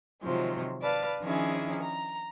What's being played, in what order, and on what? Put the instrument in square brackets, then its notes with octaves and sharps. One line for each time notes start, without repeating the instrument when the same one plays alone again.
[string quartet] C3 D#3 F3 F#3 G#3
B4 D5 F5 A5 B5
D#3 F3 C#4 D4 E4 G#4
A#5